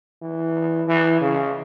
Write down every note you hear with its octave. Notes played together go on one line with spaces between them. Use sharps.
E3
E3
C#3